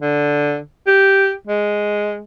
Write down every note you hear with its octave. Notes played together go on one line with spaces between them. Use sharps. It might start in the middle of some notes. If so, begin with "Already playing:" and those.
D3
G4
G#3